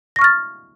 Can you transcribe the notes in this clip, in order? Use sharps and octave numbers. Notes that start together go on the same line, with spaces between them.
C#6 F6 A6 A#6